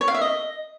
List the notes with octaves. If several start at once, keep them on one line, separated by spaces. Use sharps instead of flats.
C#5
F5
E5
D#5